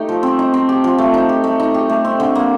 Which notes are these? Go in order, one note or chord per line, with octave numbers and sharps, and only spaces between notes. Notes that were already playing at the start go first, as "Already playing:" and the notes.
Already playing: A3 D#4 G4
F3
C4
D#4
C4
G4
F3
A3
D#4
G4
A3
D#4
G4
A3
C4
D3
A#3